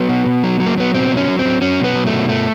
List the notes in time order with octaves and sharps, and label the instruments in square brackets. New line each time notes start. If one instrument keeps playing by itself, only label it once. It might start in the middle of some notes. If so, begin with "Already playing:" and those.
Already playing: [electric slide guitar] F#3 B3
B2
B2
F#3
F#3
A#3
F#3 B3
B2 C4
F#3
C#4
F#3
C4
F#3
F#3 C#4
B2 B3
F#3
A3
B2
A3